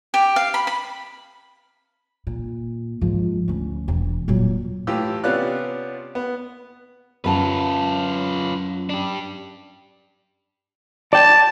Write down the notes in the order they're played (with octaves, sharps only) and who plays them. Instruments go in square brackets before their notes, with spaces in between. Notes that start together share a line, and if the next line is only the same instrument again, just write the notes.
[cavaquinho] G4
F5
B5
B5
[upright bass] A#2
G#2 F3
D2 C#4
E1
A#2 F#3
[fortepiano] A2 E3 F4 G4 E6
C3 B3 C#4 F4 D5 F#6
B3
[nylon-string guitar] F#2 A5 [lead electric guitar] F4 B4
[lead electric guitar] D4 G4
[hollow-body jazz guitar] D5 G5 [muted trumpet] A5